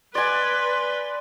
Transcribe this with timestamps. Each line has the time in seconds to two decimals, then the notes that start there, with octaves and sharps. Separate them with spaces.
0.15 B4 D5 G#5 C6